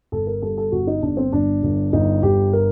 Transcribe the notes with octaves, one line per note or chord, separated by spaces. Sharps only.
G1 A4
A#4
G2 A4
A4
G1 F#4
D#4
G1 D4
C4
G1 D4
G1
G1 D#4
G1 G4
A#4